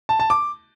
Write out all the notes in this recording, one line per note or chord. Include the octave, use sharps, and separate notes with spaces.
A5
A5
D6